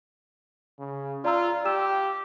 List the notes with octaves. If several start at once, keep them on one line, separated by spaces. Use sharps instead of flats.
C#3
F4 D5 A#5 E6
G4 E6 E7